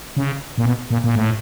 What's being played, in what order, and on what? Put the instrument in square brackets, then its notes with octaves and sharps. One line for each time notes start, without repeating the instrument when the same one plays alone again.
[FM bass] C#3
A#2
B2
A#2
A#2
A2